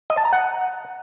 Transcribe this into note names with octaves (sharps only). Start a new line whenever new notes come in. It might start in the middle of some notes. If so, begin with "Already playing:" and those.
D#5
A5
A#5
F#5